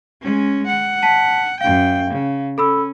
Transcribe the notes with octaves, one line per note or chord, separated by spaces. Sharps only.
G#3 C#4
F#5
A5 B6
F#2 F5 G5
C#3
C#4 A4 B5 E6